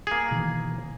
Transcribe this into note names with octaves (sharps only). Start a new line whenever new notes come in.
A#3 G#4
B2 D#3 E3